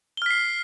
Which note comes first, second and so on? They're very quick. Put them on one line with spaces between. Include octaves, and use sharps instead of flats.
G7 F6 B6 C7